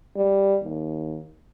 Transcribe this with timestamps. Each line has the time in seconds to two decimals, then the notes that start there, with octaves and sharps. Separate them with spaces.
0.16 G3
0.63 D#2